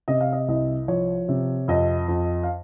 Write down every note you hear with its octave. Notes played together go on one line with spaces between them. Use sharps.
C3 D#5
F5
D#5
C2 D#5
F3 C#5
C3
F2 D#5
F2
F5